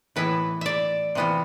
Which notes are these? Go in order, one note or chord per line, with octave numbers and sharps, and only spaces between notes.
A2 E3 B3 E4 B4
D5 E5
C3 E3 B3 F4